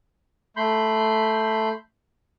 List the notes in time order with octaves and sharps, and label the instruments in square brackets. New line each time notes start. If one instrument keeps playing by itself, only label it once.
[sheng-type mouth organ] A3 B5 C6 G6